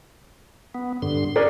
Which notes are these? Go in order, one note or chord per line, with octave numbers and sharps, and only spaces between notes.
B3
G2 D3 C6
C#4 G#4 A#4 B4 D5